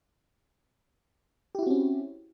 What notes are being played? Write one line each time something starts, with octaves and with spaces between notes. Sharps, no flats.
C4 C#4 E4 F#4 G4